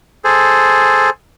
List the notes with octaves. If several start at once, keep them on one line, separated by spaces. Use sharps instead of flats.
G#4 A4 C5